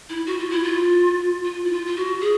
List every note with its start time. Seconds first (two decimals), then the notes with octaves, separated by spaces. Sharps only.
0.09 E4
0.26 F#4
0.38 F4
0.50 E4
0.63 F4
1.45 F4
1.64 E4
1.71 F4
1.86 F4
1.96 F#4
2.21 G#4